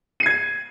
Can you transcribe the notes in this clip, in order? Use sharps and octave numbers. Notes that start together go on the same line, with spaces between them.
G#6 C7 D#7